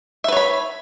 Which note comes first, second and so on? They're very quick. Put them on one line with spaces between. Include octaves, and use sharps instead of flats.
E5 B4 C#5 B5